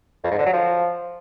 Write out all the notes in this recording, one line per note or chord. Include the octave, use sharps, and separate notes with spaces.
F2
G#2
D3
F#3
F3